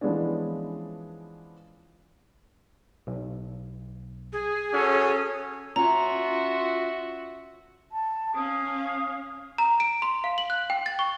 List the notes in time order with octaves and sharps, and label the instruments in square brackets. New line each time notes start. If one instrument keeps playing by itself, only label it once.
[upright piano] E3 F3 G#3 B3 C#4 D4
[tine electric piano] B1
[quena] G#4
[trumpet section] C#4 F#4 A4
[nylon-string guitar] C#4 [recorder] F4 [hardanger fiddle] F#4 E5 [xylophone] A#5
[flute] A5
[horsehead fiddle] C#4 F5 [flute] D#6
[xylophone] A#5
D7
C6
F5
F#7
F#6
G5
A6
C#6